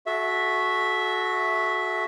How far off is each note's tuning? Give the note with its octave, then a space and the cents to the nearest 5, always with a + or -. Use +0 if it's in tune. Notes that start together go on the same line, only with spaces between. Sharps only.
F#4 -10 A4 -40 E5 +0